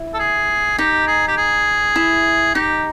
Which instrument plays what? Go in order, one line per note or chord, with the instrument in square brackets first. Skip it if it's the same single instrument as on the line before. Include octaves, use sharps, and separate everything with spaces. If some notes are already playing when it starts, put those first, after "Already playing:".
Already playing: [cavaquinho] E4
[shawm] A4
G#4
[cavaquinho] D#4 [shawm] G4
[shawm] G#4
G4
G#4
[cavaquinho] E4
[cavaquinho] D#4 [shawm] G4